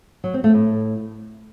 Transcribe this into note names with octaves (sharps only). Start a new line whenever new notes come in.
F#3
C4
A3
A2